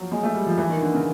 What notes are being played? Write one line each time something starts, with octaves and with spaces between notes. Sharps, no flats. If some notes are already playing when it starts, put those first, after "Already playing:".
Already playing: F3 F#3
G#3
A3
G3
F3
E3
D#3
D3
C#3